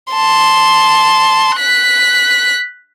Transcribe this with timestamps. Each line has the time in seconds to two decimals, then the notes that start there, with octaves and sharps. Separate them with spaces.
0.13 A5 C6
1.57 F#6 B6